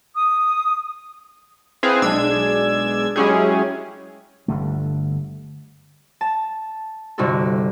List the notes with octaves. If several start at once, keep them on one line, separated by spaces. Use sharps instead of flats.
D#6
C4 E4 G#4 B4 C5 F5
B1 G#3 D4 E6 G#6
F#3 G#3 C#4 E4 G4 G#4
G1 D3 A3
A5
G1 G2 C3 D#4 F#4 A4